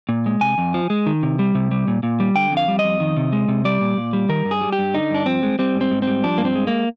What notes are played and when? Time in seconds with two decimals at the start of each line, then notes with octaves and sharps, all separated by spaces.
0.09 A#2
0.26 G#3
0.41 C3 G#5
0.58 F2
0.74 F3
0.90 G#3
1.06 D#3
1.23 C3
1.39 G3
1.55 C3
1.71 G3
1.88 A#2
2.03 A#2
2.20 G3
2.36 D3 G5
2.51 F2
2.57 F5
2.68 G3
2.79 D#5
2.84 F2
3.00 D#3
3.16 C3
3.33 G#3
3.48 C3
3.65 G3 D5
3.81 A#2
3.97 A#2
4.13 G3
4.29 D#3 A#4
4.45 G2
4.51 G#4
4.61 G3
4.72 G4
4.79 G2
4.94 D3 D#4
5.10 G2 D4
5.26 F3 C4
5.43 G#3
5.59 G3 C4
5.75 G#2
5.81 C4
5.91 G#2
6.02 G3 C4
6.24 F3 D4
6.38 G2 A#3
6.45 C4
6.55 G#3
6.67 A#3